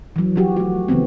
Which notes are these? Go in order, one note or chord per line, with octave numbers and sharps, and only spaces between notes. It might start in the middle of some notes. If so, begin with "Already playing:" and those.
E3 F#3
F3 F#3 F#4 G4
A3 F#4
C#3 E3 A3 B3 C4